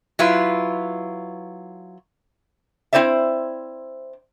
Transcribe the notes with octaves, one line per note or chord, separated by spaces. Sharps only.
F#3 E4 F4 B4
C4 E4 C5 D5 E5